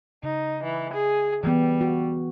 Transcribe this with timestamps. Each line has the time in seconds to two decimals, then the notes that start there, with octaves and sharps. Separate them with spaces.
0.23 C#3 D#4
0.63 E3
0.93 G#4
1.44 E3 G3 B3
1.81 F#4